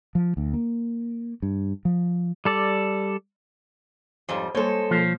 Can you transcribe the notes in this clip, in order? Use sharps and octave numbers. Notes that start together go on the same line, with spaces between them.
F3
D2
A#3
G2
F3
G3 A4 D5
F2 G#2 G3 C5 C#5
G3 G#3 A#3 A4 C5 C#5
B2 F3 A#3